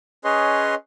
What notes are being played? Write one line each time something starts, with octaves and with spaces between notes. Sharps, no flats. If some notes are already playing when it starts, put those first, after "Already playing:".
C#4 G#4 B4 C#5 D#5 C6